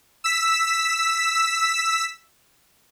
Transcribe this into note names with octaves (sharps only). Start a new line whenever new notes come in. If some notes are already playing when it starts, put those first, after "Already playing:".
E6 B6